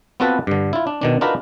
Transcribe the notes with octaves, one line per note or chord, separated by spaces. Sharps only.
B3 C4 F4 F#4 A4 B4
G2 D3
E4 F4
D4
B2 D#3 D4
D4 D#4 F4 F#4 A#4 B4